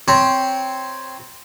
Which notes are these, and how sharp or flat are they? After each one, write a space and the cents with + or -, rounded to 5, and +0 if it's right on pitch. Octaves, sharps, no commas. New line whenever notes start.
C4 +0 C#5 +0 B5 -45